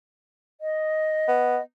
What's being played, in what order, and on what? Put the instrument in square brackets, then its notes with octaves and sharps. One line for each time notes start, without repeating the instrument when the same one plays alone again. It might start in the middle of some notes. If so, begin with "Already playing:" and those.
[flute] D#5
[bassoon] B3